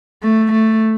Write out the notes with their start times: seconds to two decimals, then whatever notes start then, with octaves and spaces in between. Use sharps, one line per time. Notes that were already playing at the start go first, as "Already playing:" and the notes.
0.23 A3
0.53 A3